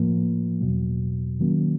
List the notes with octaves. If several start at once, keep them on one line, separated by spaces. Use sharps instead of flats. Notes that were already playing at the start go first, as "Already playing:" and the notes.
Already playing: A2 F3 A#3
E2 B2 F#3
D#3 F#3 A#3 C#4